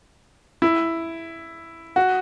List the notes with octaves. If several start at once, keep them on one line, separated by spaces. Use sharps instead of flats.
E4
F#4